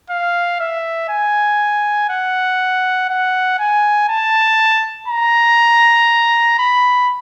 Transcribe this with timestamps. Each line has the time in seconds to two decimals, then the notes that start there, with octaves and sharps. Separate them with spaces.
0.10 F5
0.60 E5
1.09 G#5
2.10 F#5
3.10 F#5
3.59 G#5
4.09 A5
5.08 A#5
6.59 B5